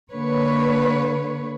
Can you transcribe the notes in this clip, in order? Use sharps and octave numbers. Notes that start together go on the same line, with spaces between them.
D3 A#3 B4 C#5